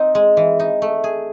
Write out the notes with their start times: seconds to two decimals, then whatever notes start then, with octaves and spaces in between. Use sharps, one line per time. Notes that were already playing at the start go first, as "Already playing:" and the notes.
Already playing: C4 D#4
0.15 G#3
0.37 E3
0.60 D#4
0.82 A3
1.04 G#4